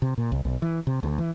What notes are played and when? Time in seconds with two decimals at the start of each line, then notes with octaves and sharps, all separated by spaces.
0.02 C3
0.18 A#2
0.32 C2
0.45 B1
0.62 E3
0.87 C3
1.03 D2
1.18 E3